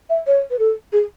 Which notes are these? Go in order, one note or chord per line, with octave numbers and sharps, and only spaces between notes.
E5
C#5
B4
A4
G#4